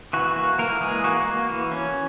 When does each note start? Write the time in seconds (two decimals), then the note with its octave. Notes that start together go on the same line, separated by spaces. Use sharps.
0.13 E3 F#4
0.36 A#3 F#4
0.58 E3 A#3 A#4
0.81 E3 G#3 G#4
1.04 A#3 F#4
1.26 A#3
1.49 E3
1.72 C#4